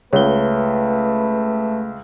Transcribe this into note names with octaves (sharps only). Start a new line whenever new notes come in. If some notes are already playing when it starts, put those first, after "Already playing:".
C#2 A3 B4 C#5 G7